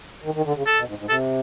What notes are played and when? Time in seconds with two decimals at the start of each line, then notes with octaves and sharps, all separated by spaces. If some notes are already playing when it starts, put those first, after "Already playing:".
0.24 D#3
0.34 D#3
0.45 D3
0.56 C#3
0.66 A4
0.77 B2
0.88 G#2
0.98 G#2
1.09 C3 A4